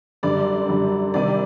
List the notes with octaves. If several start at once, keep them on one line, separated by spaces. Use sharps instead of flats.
F#2 D3 G3 D5
F#2 D3 G3
C3 D#3 G3 D5